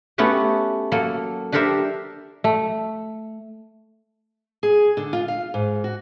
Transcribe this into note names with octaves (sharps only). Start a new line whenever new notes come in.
A3 B3 C#4 F#4 G4
F#3 A#3 A4
D4 G4 A4 A#4 C5 E5
A3
G#4
D3
F4
F5
G#2
F#4